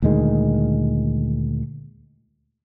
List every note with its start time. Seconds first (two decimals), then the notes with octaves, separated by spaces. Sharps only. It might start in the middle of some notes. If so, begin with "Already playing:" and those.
0.02 D2 A#2 D#3 G#3